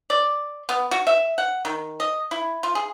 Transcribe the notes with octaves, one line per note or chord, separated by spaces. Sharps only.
D5
B3
F#4
E5
F#5
D#3
D#5
E4
F4
G#4